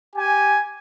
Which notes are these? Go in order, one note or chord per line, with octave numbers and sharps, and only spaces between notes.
G4 G#5